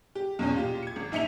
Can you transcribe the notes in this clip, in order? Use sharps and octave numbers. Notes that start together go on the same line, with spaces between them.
G4
E2 B2 C#4
A#2 F4 G4
G#6 C#7
G#1
A#1 D#4 E5 C#7 F7